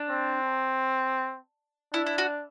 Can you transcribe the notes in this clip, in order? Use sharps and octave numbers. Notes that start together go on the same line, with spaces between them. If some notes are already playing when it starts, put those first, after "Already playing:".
Already playing: D4
C4
D4 E4
E4
F#4